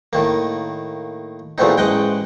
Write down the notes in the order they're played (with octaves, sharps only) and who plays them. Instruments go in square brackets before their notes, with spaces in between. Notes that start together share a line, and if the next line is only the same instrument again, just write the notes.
[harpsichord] A2 D#3 A#3
E2 A#2 A3 B3 C4 D#4
A1 G#3 D#5 F#5 G5